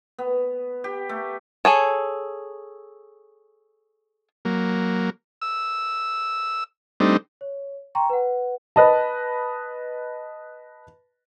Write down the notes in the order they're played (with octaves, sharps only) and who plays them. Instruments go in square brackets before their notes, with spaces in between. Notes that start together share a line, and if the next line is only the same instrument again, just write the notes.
[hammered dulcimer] B3
G4
A3
[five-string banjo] G#4 A4 C#5
[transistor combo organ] F#3 A#3
E6
G3 A3 C4 D4 D#4
[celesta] C#5
G5 A#5 C6 C#6
B4 F#5
[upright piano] B4 D#5 A5